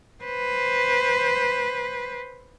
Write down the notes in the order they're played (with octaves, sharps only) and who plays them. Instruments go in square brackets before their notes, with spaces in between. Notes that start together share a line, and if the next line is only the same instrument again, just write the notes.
[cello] B4 C5